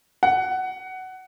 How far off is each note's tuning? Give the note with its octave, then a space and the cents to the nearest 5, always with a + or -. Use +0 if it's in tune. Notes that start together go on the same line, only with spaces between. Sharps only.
F#5 +15